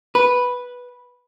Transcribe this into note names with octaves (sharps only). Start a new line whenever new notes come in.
B4